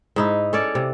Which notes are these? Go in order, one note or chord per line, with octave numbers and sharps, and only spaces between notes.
G#2 D#4 E4
C#4 A4 C#5 D5
C3